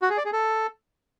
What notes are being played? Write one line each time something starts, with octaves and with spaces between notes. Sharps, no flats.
F#4
G#4
D5
G#4
A4